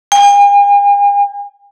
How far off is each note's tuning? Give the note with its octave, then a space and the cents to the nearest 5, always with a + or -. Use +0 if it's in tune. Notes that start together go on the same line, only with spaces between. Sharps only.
G#5 -45